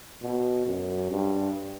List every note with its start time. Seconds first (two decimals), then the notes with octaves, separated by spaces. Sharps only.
0.22 B2
0.66 F#2
1.11 G2